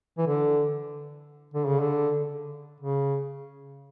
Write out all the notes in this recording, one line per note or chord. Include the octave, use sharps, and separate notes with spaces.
E3
D3
D3
C#3
D3
C#3